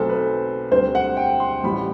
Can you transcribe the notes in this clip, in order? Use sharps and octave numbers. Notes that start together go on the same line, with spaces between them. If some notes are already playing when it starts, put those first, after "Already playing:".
Already playing: B1 B2 A3 C4 A4 C5
B4
D2 D3 G3 C4 C5
F#5
G5
C6
A1 A2 E3 G3 B5